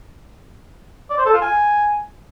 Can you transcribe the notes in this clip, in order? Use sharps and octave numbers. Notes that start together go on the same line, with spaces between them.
D5
C5
A4
F4
G#5